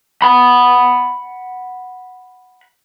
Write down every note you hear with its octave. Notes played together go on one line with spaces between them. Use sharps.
F#5 B5